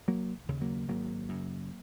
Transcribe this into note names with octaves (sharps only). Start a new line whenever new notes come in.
F1 F#3 A#3
D#2 C#3
F#3 A#3
G#1 F#3 A#3
F#2 C#3